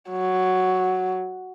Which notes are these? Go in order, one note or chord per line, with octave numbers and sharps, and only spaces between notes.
F#3